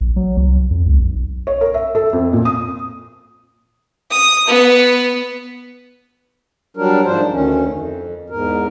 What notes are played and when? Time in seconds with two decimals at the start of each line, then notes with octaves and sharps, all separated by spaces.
0.01 A#1
0.16 F#3
0.37 C2
0.71 F2
0.86 C#2
0.99 B1
1.47 C#5
1.61 A#4
1.74 E5
1.95 A4
2.13 F2
2.33 A#2
2.45 D#6
4.11 D#6
4.47 B3
6.77 F#3 G3 D4 A#4
7.05 G#2 F3 D4 C5
7.31 D2 D#3 C#4
7.66 F2
8.30 E2 G#2 A#4